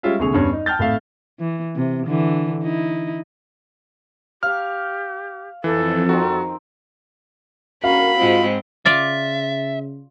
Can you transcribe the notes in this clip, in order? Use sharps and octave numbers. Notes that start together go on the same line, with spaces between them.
G3 G#3 C#4 F4 E5 F5
C2 A#2 D3 G#4 C#6 F7
E2 G2 C#4
D#4
G5 A5 F6 G6 A6
G#1 A2 A3 E5 F5
E3
C3
D3 E3
D#4 E4
G4 F5 C#6 F6
F2 E3 A4
D#3 C4 F#4
A#1 A2 C#4 F#4 A#4 F5 B5
G#2 G#3 C4 F4
C#3 F4 D5 E5 F5 A6